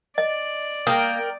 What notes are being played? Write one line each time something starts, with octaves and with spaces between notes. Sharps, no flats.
D5 D#5
A#3 A#4 G5 D#6